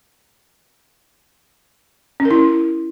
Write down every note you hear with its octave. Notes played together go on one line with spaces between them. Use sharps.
C#4
A#4
E4